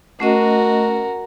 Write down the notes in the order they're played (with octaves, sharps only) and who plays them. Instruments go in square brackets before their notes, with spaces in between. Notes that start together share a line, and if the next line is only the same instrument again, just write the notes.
[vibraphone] A3 C#4 D#5 [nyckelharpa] F#4 A#4